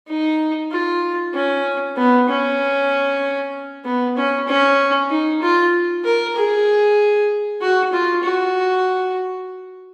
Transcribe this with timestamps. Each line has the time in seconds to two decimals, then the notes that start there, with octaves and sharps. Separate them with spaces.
0.08 D#4
0.71 F4
1.34 C#4
1.97 B3
2.29 C#4
3.85 B3
4.17 C#4
4.48 C#4
5.10 D#4
5.42 F4
6.05 A#4
6.36 G#4
7.61 F#4
7.93 F4
8.24 F#4